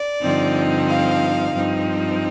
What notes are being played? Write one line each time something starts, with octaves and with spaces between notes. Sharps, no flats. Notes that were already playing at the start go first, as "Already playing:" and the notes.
Already playing: D5
G2 D3 F3 C4 D#4
F5
G2 F3 C4 D#4